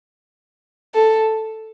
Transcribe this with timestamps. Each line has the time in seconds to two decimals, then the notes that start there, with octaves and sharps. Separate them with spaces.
0.95 A4